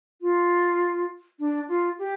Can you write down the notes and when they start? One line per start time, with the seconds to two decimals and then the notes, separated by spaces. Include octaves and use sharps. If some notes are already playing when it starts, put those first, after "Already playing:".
0.21 F4
1.39 D4
1.69 F4
1.99 G4